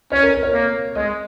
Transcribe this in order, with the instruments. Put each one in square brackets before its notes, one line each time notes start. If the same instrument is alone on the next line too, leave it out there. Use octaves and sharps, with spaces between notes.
[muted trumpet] C#4 [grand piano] C#5
[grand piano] A#4
A#4
C#5
[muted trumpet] A#3
[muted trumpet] G#3 [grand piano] D#5